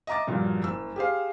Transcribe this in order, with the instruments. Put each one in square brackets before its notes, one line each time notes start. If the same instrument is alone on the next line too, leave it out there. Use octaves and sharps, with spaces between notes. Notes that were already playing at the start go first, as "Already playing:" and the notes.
[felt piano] D#5 E5 A#5 D6 A6
G2 A#2 F3 F#3
F#1 E6
G4 G#4 C5 F5